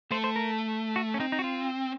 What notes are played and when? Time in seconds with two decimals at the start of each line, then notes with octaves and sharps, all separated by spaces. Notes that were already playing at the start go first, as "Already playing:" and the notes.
0.11 A3 C5
0.24 C5
0.36 A#4
0.96 F#4
1.14 C#4
1.20 C4 D#4
1.32 D#4
1.39 F#4
1.44 F4